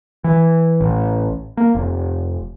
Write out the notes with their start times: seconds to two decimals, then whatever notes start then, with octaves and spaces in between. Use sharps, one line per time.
0.24 E3
0.81 A1
1.57 A#3
1.75 F1